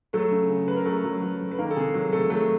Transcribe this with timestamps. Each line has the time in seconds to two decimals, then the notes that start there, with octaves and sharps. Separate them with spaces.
0.13 F#3 A3 A4
0.31 C#3
0.49 C#3
0.68 C#3 B4
0.77 A#4
0.85 F#3 A3 A4
1.04 F#3
1.22 F#3
1.40 F#3
1.51 B4
1.58 D#3 A#3 A#4
1.71 A4
1.76 C3 G#3 G#4
1.94 F#3
2.12 C3 A3 A4
2.30 F#3 A3 A4